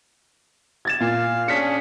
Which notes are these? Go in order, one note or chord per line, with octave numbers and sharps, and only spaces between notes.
G#6 A6 E7
A#2 F5
C#4 D4 G#4 B6 C#7